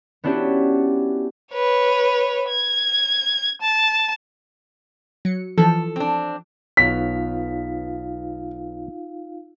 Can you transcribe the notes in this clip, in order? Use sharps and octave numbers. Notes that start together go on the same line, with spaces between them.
B3 C#4 D4 E4 F#4 G4
B4 C#5
G#6
A5
F#3 C#7
E3 F3 A4
C4 D4
B1 B3 D#4 F4 C#5 F5 B6